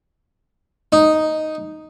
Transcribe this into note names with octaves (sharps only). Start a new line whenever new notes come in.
D#4